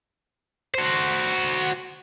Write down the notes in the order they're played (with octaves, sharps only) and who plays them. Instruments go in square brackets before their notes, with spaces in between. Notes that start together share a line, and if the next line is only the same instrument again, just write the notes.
[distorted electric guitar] F#4 C5